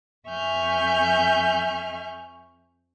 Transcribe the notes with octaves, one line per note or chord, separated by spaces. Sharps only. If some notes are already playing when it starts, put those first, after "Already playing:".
F2 E5 G#5 C#6 F6 G6